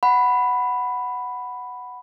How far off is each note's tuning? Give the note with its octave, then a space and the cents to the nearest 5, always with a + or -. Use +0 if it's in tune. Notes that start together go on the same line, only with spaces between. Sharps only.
F#5 +0 B5 +0